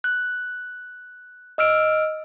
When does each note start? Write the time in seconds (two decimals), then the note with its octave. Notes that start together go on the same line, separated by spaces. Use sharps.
0.04 F#6
1.58 D#5 E6 F6 D7